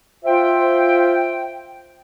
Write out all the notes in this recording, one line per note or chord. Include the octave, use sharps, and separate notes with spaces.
F4 C5 E5 G5